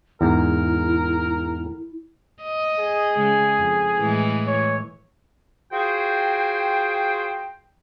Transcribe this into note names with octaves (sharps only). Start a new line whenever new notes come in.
E2 G#2 E4 A#4
D#5
G#4
C#3 G#3
F2
A2 E3 G#3
C#5
F4 F#4 G#4 C5 G5